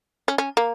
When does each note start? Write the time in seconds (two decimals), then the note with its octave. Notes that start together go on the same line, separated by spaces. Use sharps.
0.28 C#4
0.38 C#4
0.57 A#3